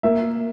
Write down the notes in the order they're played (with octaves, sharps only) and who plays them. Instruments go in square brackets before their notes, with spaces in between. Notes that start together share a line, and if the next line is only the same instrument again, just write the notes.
[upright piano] A#3 E5